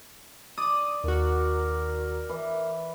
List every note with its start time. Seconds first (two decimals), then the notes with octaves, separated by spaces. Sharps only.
0.58 D5 D#6
1.04 D#2 F#4 A#4
2.29 E3